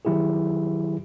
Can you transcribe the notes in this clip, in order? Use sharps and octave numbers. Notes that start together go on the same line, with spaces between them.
D#3 F#3 E4 G4 G#4